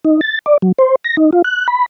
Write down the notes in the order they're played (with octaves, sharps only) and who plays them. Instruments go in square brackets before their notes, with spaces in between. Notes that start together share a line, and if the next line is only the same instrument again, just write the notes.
[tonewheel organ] D#4
A6
D5
F#3
C5
A#6
D#4
F4
F#6
B5